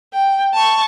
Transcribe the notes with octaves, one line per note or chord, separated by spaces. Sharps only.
G5
A5 C#6